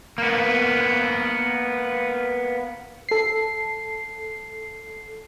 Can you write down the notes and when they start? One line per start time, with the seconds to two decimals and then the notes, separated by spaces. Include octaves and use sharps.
0.18 A#3 B3
3.09 A4 C7